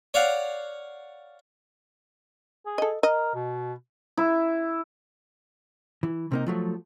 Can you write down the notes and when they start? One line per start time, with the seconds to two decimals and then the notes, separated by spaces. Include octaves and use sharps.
0.14 C#5 D5 F5 F#5
2.66 G#4
2.78 A4 D#5
3.03 A#4 D#5
3.35 B2
4.17 E4
6.03 E3
6.32 C3 A#3 D#4
6.47 F3 F#3 A3